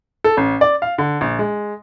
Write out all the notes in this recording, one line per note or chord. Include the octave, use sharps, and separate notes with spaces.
A4
A1
D5
F5
D3
A#1
G#3